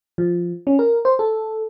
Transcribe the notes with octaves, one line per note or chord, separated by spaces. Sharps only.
F3
C#4
A#4
C5
A4